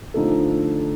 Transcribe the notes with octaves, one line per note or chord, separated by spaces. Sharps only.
D3 F3 A3 D#4 A4